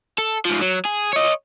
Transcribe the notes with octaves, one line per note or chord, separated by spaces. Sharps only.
A4
G#2 F3
F#3
G#4
C#5 D#5